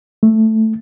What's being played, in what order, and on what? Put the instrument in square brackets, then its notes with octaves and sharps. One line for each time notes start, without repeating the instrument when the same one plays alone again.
[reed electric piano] A3